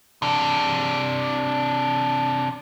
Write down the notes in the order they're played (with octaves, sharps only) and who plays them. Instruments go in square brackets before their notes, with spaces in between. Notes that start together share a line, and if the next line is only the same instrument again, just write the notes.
[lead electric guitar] C3 D4